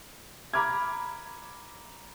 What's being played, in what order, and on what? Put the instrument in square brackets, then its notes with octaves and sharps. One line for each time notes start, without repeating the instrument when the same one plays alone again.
[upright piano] A#5 B5 D6 F6 G#6